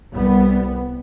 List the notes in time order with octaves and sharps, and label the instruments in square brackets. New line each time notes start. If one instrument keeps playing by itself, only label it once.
[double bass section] C2 G3 B3